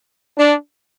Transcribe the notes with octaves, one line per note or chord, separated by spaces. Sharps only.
D4